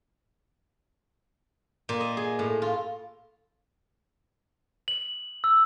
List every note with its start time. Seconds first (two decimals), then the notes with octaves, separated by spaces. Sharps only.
1.89 A#2
2.01 D#5
2.17 G#4
2.39 A2
2.62 F4
4.88 F#7
5.44 E6